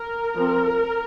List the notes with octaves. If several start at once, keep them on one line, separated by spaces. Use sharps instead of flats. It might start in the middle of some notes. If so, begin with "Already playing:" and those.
Already playing: A#4
F3 C4